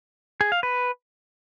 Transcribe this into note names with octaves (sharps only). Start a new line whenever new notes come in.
G#4
F5
B4